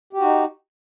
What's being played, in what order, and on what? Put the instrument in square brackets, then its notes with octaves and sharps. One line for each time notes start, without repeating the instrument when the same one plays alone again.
[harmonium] G4
F#4
D#4